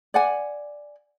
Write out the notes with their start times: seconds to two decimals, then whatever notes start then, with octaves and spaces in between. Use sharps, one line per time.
0.14 D5 F#5 G#5